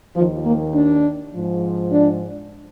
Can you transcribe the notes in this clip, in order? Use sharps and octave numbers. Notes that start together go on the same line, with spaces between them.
D#2 D#3 F3
A#3
D4
G#2 F3
D4